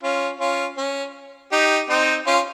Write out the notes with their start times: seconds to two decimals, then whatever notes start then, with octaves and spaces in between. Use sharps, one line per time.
0.03 C#4 F4
0.40 C#4 F4
0.77 C#4
1.52 D#4 G4
1.90 C4 D#4
2.27 C#4 F4